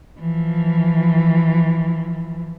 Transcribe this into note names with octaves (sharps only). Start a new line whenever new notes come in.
E3 F3